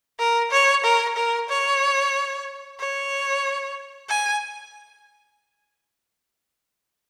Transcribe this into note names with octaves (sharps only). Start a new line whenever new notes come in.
A#4
C#5
A#4
A#4
C#5
C#5
G#5